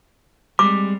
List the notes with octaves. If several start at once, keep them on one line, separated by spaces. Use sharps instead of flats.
G3 G#3 C4 D6